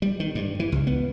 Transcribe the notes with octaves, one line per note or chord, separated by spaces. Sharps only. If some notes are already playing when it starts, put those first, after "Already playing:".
G3
D#3
G2
E3
C#2
B3